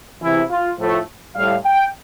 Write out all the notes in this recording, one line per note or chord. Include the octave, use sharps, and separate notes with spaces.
E2 C3 E3 E4
F4
A2 F3 A3
A2 G3 F5
G5